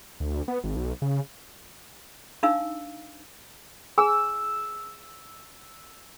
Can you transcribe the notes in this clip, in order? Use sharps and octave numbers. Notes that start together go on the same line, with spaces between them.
D2
B3
G#1
B1
C#3
D4 D#4 F5 E6
G#4 G#5 E6